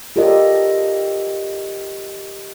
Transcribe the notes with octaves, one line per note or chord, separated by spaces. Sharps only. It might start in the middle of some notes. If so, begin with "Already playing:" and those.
F4 G4 A4 A#4 D5 D#5